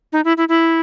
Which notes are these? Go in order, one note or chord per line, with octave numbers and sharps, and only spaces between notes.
D#4
E4
E4
E4